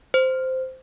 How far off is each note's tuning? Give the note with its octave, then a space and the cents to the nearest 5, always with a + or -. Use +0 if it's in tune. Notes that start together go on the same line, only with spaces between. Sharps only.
C5 -10